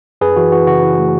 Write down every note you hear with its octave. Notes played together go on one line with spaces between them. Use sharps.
F#2 G#4 B4
E3 F#4
E3 F#4
C#3 F#4
E3
A3